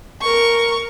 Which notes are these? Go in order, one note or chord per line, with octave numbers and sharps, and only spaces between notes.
A#4 C#6